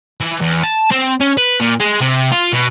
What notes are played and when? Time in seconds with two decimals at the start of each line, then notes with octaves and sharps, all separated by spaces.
0.21 E3
0.41 E2
0.63 A5
0.91 C4
1.20 C#4
1.37 B4
1.60 A#2
1.80 G#3
2.01 C3
2.32 F4
2.53 B2